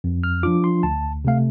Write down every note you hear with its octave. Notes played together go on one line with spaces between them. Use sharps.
F2
F6
F3 D4 F4 D6
C6
D2 A5
C3 A3 F5